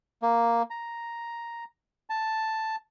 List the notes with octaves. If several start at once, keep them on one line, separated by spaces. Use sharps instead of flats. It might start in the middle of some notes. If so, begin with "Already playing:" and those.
A#3
A#5
A5